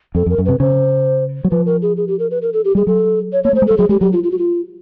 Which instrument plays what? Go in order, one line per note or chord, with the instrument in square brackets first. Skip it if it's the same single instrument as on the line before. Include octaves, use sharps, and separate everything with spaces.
[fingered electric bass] F2 [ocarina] A4
[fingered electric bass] F2 [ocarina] A#4
[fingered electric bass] F#2
[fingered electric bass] C3 [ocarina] B4
[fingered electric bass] C#3 [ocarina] C5
[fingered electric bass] F#3
[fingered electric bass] F3 [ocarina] B4
[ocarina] A#4
G#4
G#4
G4
A#4
B4
A#4
A4
G4
[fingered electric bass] G3 [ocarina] G#4
[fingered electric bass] F#3 [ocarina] A4
[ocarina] C#5
[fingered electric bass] A#3 [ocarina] C#5
[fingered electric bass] A3 [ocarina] C5
[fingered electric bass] G#3
[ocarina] A4
[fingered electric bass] G3
[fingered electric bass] F#3 [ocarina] G#4
[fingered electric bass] G#3 [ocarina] G4
[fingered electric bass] F#3 [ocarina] G4
[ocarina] F4
F4
F#4
F4